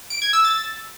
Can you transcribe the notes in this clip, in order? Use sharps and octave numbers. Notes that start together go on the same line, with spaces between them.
D7
G#6
E6
A6